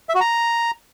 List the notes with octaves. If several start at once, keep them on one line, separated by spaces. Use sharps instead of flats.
E5
F#4
A#5